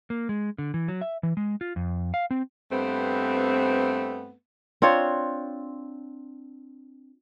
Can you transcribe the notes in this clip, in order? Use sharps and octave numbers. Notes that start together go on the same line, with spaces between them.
A#3
G#3
D3
E3
F#3
E5
E3
G#3
F4
F2
F5
C4
G2 A3 B3 C4
C4 D4 F4 C#5